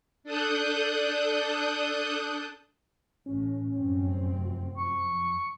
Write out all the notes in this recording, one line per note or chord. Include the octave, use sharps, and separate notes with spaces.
D4 A4 D#6 F#6 G6
A1 A2 C#4
F1 F#2 C4
F2
F2 C#6